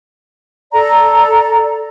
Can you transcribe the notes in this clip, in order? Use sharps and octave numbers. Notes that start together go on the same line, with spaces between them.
A4 D5 A#5